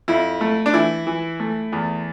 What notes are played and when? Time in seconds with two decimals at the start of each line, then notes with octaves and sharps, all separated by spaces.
0.08 F2 E4
0.41 A3
0.66 D4
0.74 E3 E4
1.07 E3
1.40 A3
1.73 E2